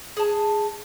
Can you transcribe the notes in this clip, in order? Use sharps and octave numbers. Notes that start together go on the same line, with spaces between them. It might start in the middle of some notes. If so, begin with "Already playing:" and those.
G#4 A5